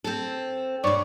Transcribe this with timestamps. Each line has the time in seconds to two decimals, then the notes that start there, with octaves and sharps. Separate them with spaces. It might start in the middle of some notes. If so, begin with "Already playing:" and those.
0.04 C4 A4
0.84 G2 B2 C#5 D5